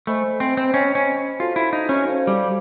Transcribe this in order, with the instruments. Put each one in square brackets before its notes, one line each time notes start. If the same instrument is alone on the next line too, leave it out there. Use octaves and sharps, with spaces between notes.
[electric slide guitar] A3 [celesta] C5 D#5 G#5 B5
[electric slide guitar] C4
C4
[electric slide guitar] C#4 [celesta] C5 D#5 G#5 B5
[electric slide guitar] C#4
[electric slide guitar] F4 [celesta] F#4 A4 C5 F5 A5
[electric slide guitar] E4
D#4
C#4
[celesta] F#4 A4 C5 F5 A5
[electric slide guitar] G3